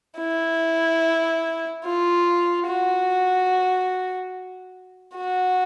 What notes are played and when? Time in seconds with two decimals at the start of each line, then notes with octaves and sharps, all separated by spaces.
0.18 E4
1.84 F4
2.67 F#4
5.16 F#4